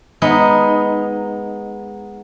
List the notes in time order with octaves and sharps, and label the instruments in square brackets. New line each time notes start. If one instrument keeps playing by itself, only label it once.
[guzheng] G#3 B3 D#4